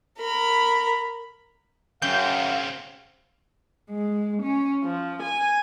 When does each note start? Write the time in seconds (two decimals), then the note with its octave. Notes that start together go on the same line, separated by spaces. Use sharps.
0.19 A#4 B5
2.02 F#2 C#3 C4 F5 G6
3.90 G#3
4.42 C#4
4.82 F3
5.21 G#5